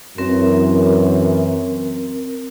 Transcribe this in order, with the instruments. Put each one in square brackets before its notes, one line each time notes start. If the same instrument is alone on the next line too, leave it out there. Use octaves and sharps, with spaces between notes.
[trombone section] F#2 E3 [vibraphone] C4 A#4